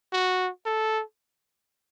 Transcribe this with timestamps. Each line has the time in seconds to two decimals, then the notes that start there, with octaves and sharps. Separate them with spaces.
0.13 F#4
0.66 A4